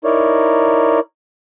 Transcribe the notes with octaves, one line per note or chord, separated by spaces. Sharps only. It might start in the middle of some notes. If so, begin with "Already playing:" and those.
D#4 E4 A#4 C#5 D5